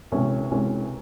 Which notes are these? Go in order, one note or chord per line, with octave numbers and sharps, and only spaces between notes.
C2 B2 G#3 C#4
C2 B2 G#3 C#4